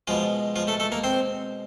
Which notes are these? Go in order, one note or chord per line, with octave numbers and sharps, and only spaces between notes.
B2 F3 G#3 F4
F3 F4
A3 A4
A3 A4
A#3 A#4
C4 C5